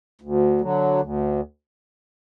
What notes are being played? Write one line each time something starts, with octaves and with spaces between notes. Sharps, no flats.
D2
D3 F#3
D2